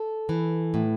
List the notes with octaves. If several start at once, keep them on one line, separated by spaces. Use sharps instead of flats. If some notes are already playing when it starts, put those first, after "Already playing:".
Already playing: A4
E3
A2